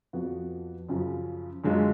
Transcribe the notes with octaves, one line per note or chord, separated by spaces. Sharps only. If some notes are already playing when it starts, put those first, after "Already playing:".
F2 F3 B3 F#4
F#2 C#3 F3
F#2 D3 G#3 C#4 F4